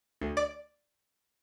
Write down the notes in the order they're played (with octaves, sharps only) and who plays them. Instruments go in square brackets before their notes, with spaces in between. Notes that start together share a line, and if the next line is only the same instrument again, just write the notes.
[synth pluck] D2
D5